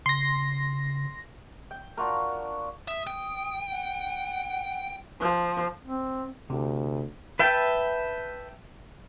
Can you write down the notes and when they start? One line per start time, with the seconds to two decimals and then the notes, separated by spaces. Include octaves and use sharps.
0.06 C#3 C6 A#6
1.71 G5
1.97 D4 F4 F#4 A#4
2.88 E5 D#6
3.07 G5
3.71 F#5
5.20 F3
5.85 C4
6.50 D2 C3
7.39 B4 E5 G5 A5